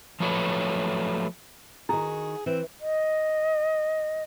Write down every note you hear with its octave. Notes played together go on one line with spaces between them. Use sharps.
F3 F#3 A3 B4 C#5
D#3 E4 F#4 G#4
E3 C4
D#5